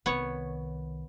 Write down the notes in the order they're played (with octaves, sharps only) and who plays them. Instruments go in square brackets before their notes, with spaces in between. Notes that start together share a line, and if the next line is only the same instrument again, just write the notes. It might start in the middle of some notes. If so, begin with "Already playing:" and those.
[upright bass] C2 D#3 [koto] B3 C#5